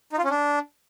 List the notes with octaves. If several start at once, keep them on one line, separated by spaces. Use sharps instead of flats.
D#4
F4
C#4
D4